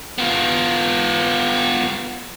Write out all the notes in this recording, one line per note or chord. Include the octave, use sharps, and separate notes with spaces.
B3 F4